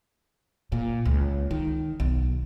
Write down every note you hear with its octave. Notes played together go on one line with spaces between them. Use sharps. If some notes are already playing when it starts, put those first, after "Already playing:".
A#2
C#2
D#3
B1